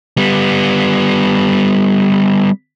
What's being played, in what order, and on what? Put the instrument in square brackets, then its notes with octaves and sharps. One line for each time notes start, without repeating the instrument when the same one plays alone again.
[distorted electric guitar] G3 B3